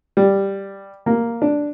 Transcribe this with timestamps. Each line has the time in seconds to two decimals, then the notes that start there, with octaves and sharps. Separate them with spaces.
0.17 G3
1.06 A#3
1.42 D4